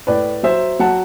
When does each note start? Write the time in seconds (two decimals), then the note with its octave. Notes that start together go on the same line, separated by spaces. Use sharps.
0.07 A2 B4 D5
0.43 F#3 C5 E5
0.79 F#3 F#5 A5